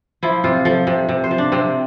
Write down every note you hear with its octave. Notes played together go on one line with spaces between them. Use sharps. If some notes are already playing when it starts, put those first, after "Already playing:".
F3 E4
C3 F4
F3 A4
C3
C3
C5
F3
D4
C3 C4